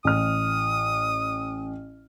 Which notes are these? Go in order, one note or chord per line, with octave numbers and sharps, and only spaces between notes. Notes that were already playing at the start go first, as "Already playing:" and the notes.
A1 D#6 F6